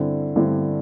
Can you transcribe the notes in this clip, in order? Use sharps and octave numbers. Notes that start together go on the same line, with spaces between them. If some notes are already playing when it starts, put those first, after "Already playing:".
Already playing: G2 D3 C4 E4
G2 D3 C4 E4